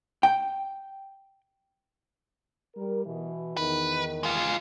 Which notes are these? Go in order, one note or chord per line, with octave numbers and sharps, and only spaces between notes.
G5
G3 A#4
B2 E3
E2 D#3 B4
G#3 F4